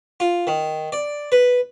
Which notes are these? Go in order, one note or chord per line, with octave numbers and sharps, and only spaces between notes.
F4
D#3
D5
B4